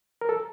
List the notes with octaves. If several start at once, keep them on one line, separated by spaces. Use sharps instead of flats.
A#4
A4